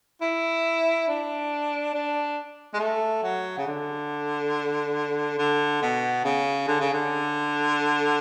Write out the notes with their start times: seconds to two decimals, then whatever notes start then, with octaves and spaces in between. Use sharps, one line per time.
0.21 E4
1.08 D4
1.94 D4
2.74 G#3
2.79 A3
3.23 F#3
3.58 C#3
3.67 D3
5.38 D3
5.82 B2
6.24 C#3
6.68 D3
6.80 C#3
6.94 D3